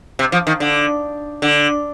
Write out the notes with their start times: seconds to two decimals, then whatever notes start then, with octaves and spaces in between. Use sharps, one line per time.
0.19 C3
0.32 F3
0.47 D#3
0.60 D3
1.42 D3